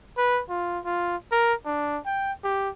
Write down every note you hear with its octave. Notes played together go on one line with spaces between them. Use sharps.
B4
F4
F4
A#4
D4
G5
G4